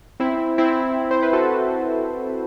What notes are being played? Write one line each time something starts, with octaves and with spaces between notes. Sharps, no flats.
C4 E4
C4 E4
C5
B4
F#4 A4